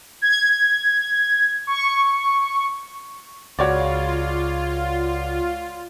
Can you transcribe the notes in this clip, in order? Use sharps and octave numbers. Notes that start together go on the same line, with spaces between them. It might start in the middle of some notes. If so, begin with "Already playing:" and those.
G#6
C#6
C#2 F4 F#4 C#5 D5